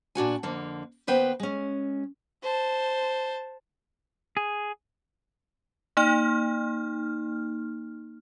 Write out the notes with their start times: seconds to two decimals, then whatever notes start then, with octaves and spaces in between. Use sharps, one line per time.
0.15 A#2 D4 F#4 G#5
0.43 F2 D3 A#3
1.07 D#2 B3 B4 C5 G5
1.40 G#3 C#4
2.43 C5 A5
4.37 G#4
5.97 A#3 D#4 F6